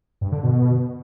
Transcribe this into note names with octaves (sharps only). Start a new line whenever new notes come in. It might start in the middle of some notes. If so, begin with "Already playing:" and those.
G2
D3
B2